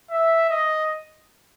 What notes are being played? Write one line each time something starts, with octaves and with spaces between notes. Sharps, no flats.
E5
D#5